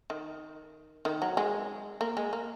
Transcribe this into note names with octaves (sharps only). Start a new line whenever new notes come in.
D#3
D#3
F#3
G#3
A#3
G#3
A#3